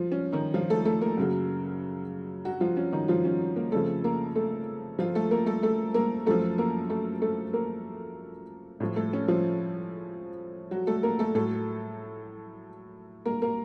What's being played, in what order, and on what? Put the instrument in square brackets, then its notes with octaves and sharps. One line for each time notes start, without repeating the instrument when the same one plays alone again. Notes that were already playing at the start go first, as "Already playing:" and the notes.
Already playing: [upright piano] F3 F4
C#4
D#3 D#4
F3 F4
A3 A4
A3 A4
A#3 A#4
F#2 C#3 F#3
F#3 F#4
F3 F4
C#4
D#3 D#4
F3 F4
C#4
A#3 A#4
F2 C#3 F3 A3 A4
A#3 A#4
A3 A4
F3 F4
A3 A4
A#3 A#4
A3 A4
A3 A4
A#3 A#4
F#2 F3 A3 A4
A#3 A#4
A3 A4
A3 A4
A#3 A#4
A2 F3
A3 A4
C#4
F3 F4
F#3 F#4
A3 A4
A#3 A#4
A3 A4
A2 F#3 A3 A4
A#3 A#4
A#3 A#4